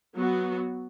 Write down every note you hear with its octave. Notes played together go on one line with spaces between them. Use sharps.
F#3 B3 F#4